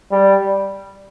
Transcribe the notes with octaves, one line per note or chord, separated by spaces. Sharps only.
G3